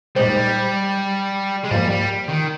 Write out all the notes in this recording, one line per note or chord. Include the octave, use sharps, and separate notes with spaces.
A#2 G3 G#3 D#4 G4 C5
G#3
G#2 F3 G3 A#3
G3
D#3